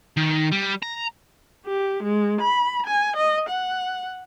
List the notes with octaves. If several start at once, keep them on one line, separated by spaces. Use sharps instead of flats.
D#3
G3
A#5
G4
G#3
B5
G#5
D#5
F#5